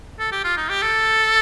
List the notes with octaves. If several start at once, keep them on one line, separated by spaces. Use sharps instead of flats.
A4
G4
F4
D#4
G4
A4